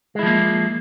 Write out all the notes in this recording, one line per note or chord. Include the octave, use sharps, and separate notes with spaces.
F3 G#3 A#3 E4